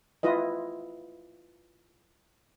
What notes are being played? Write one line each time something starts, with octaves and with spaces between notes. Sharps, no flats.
E4 F4 B4 D#5